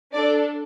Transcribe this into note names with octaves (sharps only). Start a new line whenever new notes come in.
D4 A4 D5